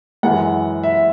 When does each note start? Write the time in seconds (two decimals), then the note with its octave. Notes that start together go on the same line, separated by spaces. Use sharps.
0.23 F#2 E3 G#3 F#5
0.83 E5